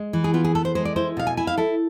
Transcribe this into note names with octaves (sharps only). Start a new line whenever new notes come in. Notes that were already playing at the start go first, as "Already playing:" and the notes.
Already playing: G#3
E3
G#4
B3 F4
G#4
B3 A4
C5
G#3 C5
D5
E4 C5
B2 F5
G#5
E4 G#5
F5
E4 A4